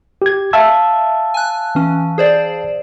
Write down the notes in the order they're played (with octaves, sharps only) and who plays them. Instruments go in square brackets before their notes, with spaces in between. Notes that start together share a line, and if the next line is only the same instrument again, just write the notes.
[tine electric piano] G4 G#6
[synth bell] E5 [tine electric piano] F5 A5 E6
[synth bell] G#5 F#6
E3 C#4
G#4 C5 D5